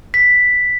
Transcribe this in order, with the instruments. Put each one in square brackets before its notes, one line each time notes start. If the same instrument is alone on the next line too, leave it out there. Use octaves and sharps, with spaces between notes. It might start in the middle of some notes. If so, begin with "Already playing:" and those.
[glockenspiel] B6